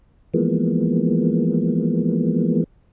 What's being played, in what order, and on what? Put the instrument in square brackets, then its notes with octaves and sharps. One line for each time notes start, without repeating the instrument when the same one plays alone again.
[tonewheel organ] E3 F3 G#3 A#3 B3